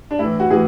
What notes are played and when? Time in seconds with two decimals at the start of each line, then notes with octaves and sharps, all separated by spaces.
0.11 D4
0.19 A2 E3 E4
0.40 F#4
0.50 A2 E3 G#4